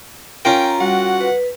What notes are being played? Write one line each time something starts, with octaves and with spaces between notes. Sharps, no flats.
C#4 F4 A#4 G5 A#5
G3 F#4 F#5
B4